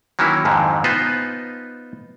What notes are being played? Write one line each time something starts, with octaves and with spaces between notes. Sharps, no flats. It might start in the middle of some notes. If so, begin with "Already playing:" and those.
D#3 E3 F#3 A#3 C#4 E4
F2 G#2 D3 D#3 F#3
B3 D#4 F4 B4 C5